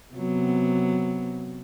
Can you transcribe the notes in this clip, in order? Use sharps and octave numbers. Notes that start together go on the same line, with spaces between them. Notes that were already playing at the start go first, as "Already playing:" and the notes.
C3 F#3 B3